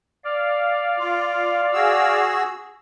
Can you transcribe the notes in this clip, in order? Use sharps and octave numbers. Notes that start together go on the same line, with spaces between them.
D5 F5
F4
F#4 G#4 E6